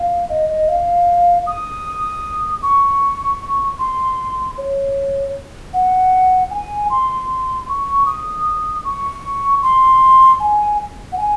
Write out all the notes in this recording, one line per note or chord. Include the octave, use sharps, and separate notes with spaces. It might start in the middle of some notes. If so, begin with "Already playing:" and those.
Already playing: F5
D#5
D#5
F5
D#6
C#6
C6
C#5
F#5
G#5
C6
C#6
D#6
C#6
C6
G#5
F#5
G#5